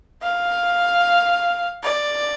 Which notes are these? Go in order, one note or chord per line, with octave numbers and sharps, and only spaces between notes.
F5
D5